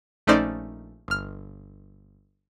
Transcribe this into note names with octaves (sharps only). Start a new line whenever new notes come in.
A#1 A3 C#4 D#4 C5 D5
G1 F6